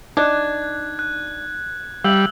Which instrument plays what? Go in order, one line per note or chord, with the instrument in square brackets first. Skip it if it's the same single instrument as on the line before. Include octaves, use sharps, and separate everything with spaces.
[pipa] D4 [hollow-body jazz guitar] D#4 D5 [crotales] F#6 G#6
[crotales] F#6
[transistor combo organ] G3 [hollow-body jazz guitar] E5 F5 [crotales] E6 F#7